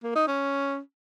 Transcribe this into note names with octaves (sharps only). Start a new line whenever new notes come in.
A#3
D#4
C#4